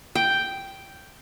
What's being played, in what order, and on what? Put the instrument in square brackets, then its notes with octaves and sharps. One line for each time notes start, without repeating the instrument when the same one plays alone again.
[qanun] G5